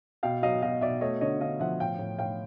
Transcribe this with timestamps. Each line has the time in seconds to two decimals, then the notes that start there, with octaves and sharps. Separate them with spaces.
0.23 B2 F5 G5
0.42 F#3 D#5 F5
0.62 B2 D#5 F5
0.81 B2 D5 E5
1.01 A3 C#5 D#5
1.21 D3 C#5 D#5
1.41 D3 D#5 F5
1.60 F3 E5 F#5
1.79 A2 F5 G5
1.99 A2
2.19 A2 F5 G5